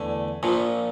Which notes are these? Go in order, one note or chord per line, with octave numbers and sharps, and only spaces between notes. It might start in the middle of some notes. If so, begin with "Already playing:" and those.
Already playing: E2 D3 A3
A#1 A#2 F3